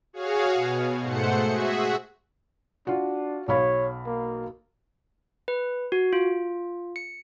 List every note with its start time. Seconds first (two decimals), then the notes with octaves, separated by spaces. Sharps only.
0.13 F#4 G#4 C#5 F5
0.54 B2
1.02 G#2 A3 C5 F#5 C#7
1.48 F#4 G#4 E5
2.87 D4 F4 F#4
3.48 B1 C#5 F5 B5
4.06 A#3
5.48 B4
5.92 F#4
6.13 F4
6.96 C#7